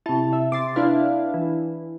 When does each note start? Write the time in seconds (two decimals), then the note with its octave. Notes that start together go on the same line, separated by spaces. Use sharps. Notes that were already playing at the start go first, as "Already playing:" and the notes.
0.06 C3 E4 A5
0.33 E5
0.52 C3 C6 D6 A6
0.76 D4 E4 B4 F5
1.34 E3